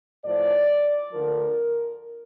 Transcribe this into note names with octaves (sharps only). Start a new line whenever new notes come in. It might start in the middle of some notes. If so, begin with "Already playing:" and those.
A2 F3 D5
D2 D3 F3 A#4